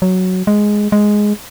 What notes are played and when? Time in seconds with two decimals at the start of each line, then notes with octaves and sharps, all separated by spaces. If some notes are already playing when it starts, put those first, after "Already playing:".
0.02 F#3
0.47 G#3
0.92 G#3